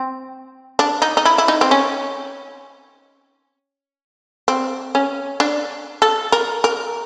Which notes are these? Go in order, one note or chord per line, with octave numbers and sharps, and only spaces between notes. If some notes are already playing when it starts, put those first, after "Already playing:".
Already playing: C4
D4
D#4
D#4
E4
E4
D#4
C4
C#4
C4
C#4
D4
A4
A#4
A#4